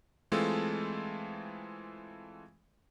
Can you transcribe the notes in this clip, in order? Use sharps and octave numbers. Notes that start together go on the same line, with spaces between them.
E3 G#3 A3 C4 F4 A4